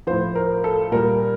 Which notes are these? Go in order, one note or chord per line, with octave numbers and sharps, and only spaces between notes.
A2 F3 C5
A#4
A4
A#2 G3 A#4